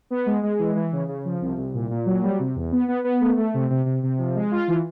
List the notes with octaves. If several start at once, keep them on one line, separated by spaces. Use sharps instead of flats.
B3
G#3
G#3
E3
E3
C#3
C#3
F3
C2
C2
A#2
A#2
F#3
G3
C3
E2
B3
B3
B3
A3
A3
C3
C3
C3
C3
F3
G#3
F4
E3